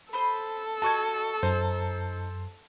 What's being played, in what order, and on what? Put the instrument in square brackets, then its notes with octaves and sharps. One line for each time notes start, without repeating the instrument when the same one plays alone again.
[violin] A4 [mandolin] C5 D#5 B5
[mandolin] F#4 D#5 [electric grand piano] A5 C#6 G#6
[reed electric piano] F#2 [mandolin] D#4 [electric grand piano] C5